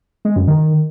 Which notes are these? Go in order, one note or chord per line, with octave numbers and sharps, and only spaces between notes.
G#3
F#2
D#3